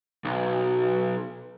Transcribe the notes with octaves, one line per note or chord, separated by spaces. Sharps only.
B1